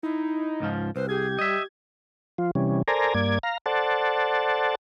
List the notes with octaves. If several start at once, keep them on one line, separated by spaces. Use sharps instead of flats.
D#4 E4
C#2 G#2 F3
C2 B4 C5
G4 G#4 G#6
G3 D#5 E5
F3 F4
C3 E3 G3 C#4
A4 A#4 C5 D5 G#5 A#5
G2 A#3 D5 G#6
F5 A#5
A4 C5 D5 F#5 A5